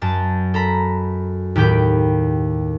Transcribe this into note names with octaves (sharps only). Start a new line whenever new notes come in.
F#2 A5 A6
A4 A#5 B5
D#2 A2 G4 G5 B5